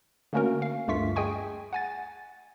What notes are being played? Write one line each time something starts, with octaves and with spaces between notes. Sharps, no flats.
D3 A3 A#3 C#4 F#4 A#4
F5
D2 G2 A3 F4 C#6 B6
G#4 D#5 G5 G#5 C#6
F#5 G#5 A6